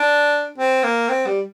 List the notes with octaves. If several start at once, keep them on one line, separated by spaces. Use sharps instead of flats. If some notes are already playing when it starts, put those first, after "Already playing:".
Already playing: D4
C4
A#3
C4
G3